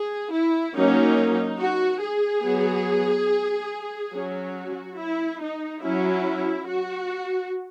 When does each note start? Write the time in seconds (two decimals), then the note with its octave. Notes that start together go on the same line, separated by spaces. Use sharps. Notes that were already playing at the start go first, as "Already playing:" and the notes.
Already playing: G#4
0.32 E4
0.75 F#3 A#3 C#4 D#4
1.59 F#4
2.02 G#4
2.44 F#3 B3
4.13 F#3 C#4 F#4
4.98 E4
5.40 D#4
5.83 F#3 C#4 E4
6.68 F#4